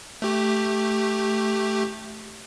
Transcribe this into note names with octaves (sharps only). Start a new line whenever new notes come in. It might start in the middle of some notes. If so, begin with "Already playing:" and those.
A3 G4